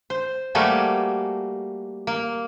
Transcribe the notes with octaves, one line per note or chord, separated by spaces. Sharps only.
C5
G3 A3 A#3 F#4 G#4 A4
A#3